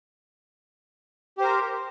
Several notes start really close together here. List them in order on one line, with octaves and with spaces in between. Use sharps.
G4 C5 A#4